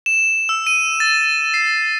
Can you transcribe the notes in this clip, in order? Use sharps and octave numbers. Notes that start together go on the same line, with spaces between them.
E7
E6
D#7
A6
C7